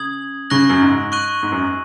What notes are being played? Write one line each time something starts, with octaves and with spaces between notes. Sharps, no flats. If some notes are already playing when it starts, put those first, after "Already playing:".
Already playing: C#3 D#6 G#6 F#7
C#3 C#6 F#6 A#6 F#7
F#2
G#2
C#6 F#6 D#7 F#7
G#2
F#2